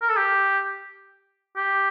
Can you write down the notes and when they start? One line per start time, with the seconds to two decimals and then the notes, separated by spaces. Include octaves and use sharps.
0.01 A#4
0.09 A4
0.17 G4
1.56 G4